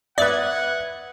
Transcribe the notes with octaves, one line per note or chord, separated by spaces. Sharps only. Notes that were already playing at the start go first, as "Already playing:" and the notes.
B4 D5 E5 F#5 D#6 F#6 G#6